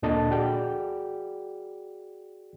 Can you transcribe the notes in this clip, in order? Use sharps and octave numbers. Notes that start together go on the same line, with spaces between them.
D2 A#2 D4 A4 D#5 A5
F#4 G#4 D5 G5